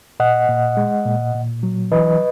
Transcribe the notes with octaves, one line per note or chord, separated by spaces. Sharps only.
A#2 D#5 F#5
A#2
G#3
A#2
A#2
F#3
E3 B4 D#5